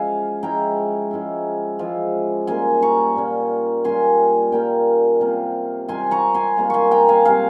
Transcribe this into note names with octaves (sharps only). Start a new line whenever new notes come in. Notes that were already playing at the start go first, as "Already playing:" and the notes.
Already playing: F3 G#3 C#4 E4 F5 G#5
F3 G#3 C#4 E4 G5 A#5
F3 G#3 C#4 E4
F3 G#3 C#4 E4
A#2 G3 A#3 C#4 G#5 C6
A#5 C#6
A#2 G3 A#3 C#4
A#2 G3 A#3 C#4 G#5 C6
A#2 G3 A#3 C#4 G5 A#5
C3 G3 A#3 F4
C3 G3 A#3 F4 G#5 C6
A#5 C#6
G#5 C6
C3 G3 A#3 F4
G#5 C6 C#6
G5 A#5
F5 G#5
C3 G3 A#3 F4 F5 G#5